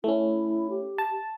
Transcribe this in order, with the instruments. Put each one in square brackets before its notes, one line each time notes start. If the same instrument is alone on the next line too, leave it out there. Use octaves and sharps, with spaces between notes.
[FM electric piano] A3 C#4 [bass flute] E4
[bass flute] G4
[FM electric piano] A5